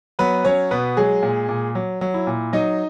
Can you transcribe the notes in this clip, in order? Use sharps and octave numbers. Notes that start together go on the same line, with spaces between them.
F#3 B3 B4
F#3 C#4 C#5
B2 B3 B4
F#3 G#3 G#4
A#2
A#2
F#3
F#3
E4
A#2
F#3 D#4 D#5